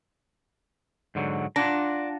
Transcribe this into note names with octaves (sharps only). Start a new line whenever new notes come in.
G#2 D3 F#3
D4 F4 F#5 A#5